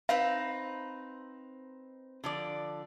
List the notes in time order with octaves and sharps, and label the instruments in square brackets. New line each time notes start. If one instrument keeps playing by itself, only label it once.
[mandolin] C4 D#4 B4 [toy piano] F5
[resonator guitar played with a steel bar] D3 F3 D5